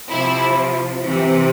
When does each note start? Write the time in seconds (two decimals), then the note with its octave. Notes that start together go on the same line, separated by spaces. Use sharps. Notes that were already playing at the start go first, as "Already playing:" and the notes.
0.11 C3 F3 E4
1.02 C3 E3